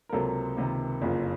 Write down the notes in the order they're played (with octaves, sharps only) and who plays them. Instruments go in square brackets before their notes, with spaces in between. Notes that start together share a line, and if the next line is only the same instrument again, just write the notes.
[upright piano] A#4
C#2 C3 F#3 A#3 A4
C#2 C3 D#3 A#3
F#1 F2 C#3 F3 A#3